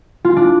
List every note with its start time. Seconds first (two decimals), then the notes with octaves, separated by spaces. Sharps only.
0.25 F4
0.36 D4